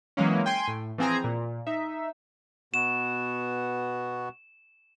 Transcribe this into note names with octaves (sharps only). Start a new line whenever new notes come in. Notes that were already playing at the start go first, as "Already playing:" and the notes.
E3 F#3 G#3 A#3 C#4
G5 G#5 C6
A2
E3 F3 C4 G#4 G#5 A#5
A#2
D#4 E5
B2 B3 F#4 E7